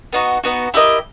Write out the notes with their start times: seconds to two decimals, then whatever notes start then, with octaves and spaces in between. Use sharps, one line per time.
0.13 B3 D#4 F#4
0.44 B3 D#4 F#4
0.74 E4 G4 A#4 D#5